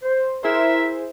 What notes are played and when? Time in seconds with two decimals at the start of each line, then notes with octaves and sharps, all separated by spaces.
0.03 C5
0.43 E4 G#4 A#4 C5 E5